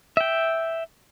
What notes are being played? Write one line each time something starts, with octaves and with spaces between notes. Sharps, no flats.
E5 G5